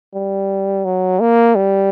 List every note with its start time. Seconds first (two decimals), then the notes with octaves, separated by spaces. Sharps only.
0.14 G3
0.85 F#3
1.20 A#3
1.55 G3